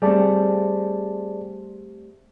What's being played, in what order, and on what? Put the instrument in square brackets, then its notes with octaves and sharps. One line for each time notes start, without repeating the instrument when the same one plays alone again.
[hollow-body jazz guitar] G3 A3 C4 [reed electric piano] G#4 D5 A5